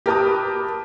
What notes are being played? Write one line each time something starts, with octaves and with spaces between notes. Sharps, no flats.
G4 A#4 B4 A5 D6 D#6